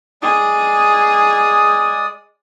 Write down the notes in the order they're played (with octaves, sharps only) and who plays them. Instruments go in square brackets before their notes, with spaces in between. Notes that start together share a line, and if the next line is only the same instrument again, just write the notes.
[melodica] G#3 D5 D#6 [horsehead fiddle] G#4